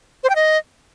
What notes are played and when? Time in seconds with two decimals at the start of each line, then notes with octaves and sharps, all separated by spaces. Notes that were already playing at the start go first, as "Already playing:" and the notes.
0.23 C5
0.29 G5
0.35 D#5